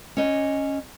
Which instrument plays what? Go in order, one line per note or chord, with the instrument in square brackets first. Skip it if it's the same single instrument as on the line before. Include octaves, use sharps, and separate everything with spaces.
[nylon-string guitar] C#4 D#5